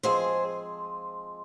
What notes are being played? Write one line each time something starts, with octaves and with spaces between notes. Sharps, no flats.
F3 G#3 C4 G#4 C5